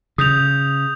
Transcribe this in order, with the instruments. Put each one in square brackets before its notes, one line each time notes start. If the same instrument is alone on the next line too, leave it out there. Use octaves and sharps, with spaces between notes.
[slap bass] C#3 [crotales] D#6 G6 F7